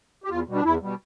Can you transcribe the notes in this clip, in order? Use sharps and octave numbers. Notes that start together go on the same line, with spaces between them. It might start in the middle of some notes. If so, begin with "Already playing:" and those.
G4
E2 F4
B2 G3
D4
E2 E4
B2 G3